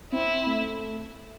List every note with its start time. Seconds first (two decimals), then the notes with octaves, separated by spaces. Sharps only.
0.12 C4 E4
0.47 A3